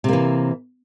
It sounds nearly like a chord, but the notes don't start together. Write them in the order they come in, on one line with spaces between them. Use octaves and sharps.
C3 A#3 E3